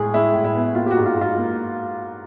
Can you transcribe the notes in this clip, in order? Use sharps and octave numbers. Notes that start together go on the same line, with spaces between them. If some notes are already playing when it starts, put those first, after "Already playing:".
Already playing: A2 G#3 G#4
G#3 E4
A2
E4
B3
A#3 F4
G4
F#4
G#2
F4
G#2
F4
A#3